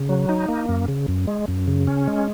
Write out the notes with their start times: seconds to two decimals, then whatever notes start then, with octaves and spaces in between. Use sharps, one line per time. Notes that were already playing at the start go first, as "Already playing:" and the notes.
Already playing: C#3
0.09 F#3
0.29 D#4
0.48 A#3
0.69 F#2
0.88 C#3
1.08 F#2
1.27 G#3
1.48 F#2
1.68 C#3
1.87 C#4
2.07 G#3